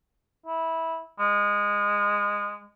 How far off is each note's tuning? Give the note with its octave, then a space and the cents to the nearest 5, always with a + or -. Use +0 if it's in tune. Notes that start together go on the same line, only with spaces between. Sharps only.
E4 -15
G#3 -20